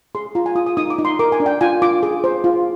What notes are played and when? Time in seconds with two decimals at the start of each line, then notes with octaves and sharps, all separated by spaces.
0.15 G#4 C6
0.35 F4 A#5
0.46 G#5
0.56 F4 D#6
0.66 D#6
0.77 D#4 D#6
0.90 D6
0.98 D#4
1.05 C6
1.19 A#4 D6
1.32 G#5
1.40 D4
1.46 G5
1.61 F4 G#5
1.82 F4 D6
2.03 G#4
2.24 C5
2.44 F4